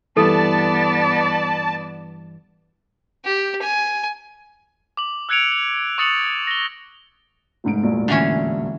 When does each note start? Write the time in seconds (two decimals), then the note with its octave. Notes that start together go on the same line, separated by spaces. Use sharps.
0.17 G2 E3 B3 A4 D5 A5
3.25 G4
3.62 G#5
4.97 D6 F#7
5.29 E6 F#6 G#6 C#7 D7 F7
5.52 F7
5.98 C#6 D#6 A6 C#7 F7 F#7
6.47 A#6 G7
7.64 F1 G#2 D7
7.83 E1 A#1 A2
8.08 D3 E3 C#4